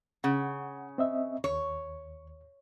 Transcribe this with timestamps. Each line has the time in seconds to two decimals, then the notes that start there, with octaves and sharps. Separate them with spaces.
0.24 C#3 F#5
0.98 C4 D#5 E5
1.44 D#2 C#5